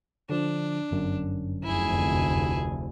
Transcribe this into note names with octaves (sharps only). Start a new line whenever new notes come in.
D3 F3 D4
G1 F#2
F1 D2 E4 G#4